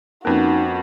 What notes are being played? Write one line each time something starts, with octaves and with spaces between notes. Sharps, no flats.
F2 A#3 C#4 D#4 F#4 A#4 B4